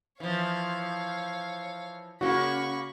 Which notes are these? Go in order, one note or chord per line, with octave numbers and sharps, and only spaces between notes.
E3 F3 C#5 F5
C#3 A#3 F#4 B5 C#6